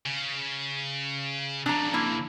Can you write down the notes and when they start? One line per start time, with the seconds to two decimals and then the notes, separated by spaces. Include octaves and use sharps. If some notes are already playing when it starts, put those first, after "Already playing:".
0.06 C#3
1.66 F2 C#3 D4 A#5
1.94 A#3 E4